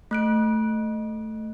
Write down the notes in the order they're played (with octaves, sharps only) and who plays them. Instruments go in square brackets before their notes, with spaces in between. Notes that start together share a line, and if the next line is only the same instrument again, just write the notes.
[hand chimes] A3 F#6 D7